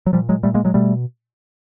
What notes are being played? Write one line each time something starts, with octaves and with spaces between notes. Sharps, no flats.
F#3
A#2 F3 G3
F#3 G#3
A#2 G3 A3
G#3 A#3
F#3 G#3
B2 G3 A3